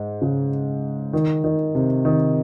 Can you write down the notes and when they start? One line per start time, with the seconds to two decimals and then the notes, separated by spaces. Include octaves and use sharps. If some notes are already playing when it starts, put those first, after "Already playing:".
Already playing: G#2
0.22 C#3
1.13 D#3
1.44 D#3
1.75 C3
2.05 D#3